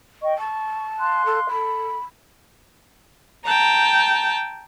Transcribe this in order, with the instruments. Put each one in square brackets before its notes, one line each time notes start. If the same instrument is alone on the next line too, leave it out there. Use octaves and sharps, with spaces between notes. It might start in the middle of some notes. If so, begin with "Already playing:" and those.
[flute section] D#5 G5 C#6
[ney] A5 [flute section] C#6
[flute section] F5 C6 F#6
[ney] A4
[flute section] A4 [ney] B5
[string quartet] G5 A5 A#5